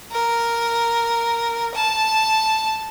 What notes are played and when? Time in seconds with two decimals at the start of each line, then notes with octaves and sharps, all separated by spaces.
0.12 A#4
1.75 A5